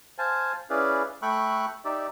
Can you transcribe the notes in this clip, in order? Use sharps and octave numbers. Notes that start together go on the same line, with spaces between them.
C5 F5 G#5 A5
C#4 E4 G#4 B4 D5 F5
A3 A4 G5 B5 C#6 F#6
D#4 G4 D5 E5